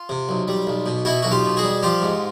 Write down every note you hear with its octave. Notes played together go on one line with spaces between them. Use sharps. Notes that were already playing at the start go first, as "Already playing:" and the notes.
Already playing: F4
C3
B1
G3
B1
B2
B2 E4 F#4
B1 F#4
F4 G4
B2
F#4 G#4
G3
F3 F4 G4
G#2